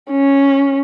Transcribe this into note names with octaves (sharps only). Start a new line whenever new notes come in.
C#4